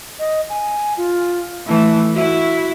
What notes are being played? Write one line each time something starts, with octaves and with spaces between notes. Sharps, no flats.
D#5
G#5
F4
E3 A3 A5
E4 F#4